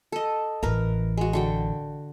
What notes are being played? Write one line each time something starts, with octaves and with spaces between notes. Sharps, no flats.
A4 D#5
A1 E3 A#4 B4 A#5
G#3 F#4
D3 F#4 G5